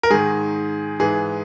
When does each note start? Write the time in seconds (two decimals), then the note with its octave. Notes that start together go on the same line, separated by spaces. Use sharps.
0.03 A#4
0.10 G#2 D#3 G#4
0.99 G#2 E3 G#4